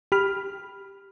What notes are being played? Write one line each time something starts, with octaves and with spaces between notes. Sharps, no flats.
G4 B5 F6